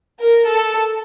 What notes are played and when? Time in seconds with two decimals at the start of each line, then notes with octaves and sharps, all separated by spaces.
0.19 A#4
0.51 A4